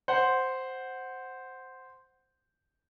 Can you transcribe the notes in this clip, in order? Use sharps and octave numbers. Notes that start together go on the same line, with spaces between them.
C5 F#5